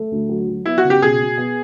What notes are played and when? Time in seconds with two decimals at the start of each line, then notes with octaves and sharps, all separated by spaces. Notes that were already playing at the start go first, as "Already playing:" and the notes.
Already playing: A3
0.11 D2
0.29 F#3
0.48 F#3
0.66 B3 E4
0.78 F#4
0.84 C#3
0.90 G4
1.02 B2 G#4
1.20 B2
1.38 B3